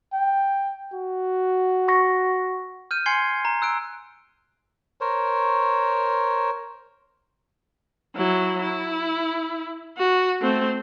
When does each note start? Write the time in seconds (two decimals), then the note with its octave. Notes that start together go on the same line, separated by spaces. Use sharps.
0.13 G5
0.93 F#4
1.88 C#6 A#6
2.91 F6 G6 D#7
3.06 G#5 C6 G#6 C7 C#7 G7
3.45 A#5
3.62 E6 F#6 D7
5.01 A#4 C5 C#5
8.16 F#3 E4
8.62 E4
9.98 F#4
10.41 A3 C4